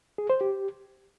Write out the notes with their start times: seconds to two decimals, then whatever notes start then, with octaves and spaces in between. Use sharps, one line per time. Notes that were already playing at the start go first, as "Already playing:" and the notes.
0.18 G#4
0.30 C5
0.41 G4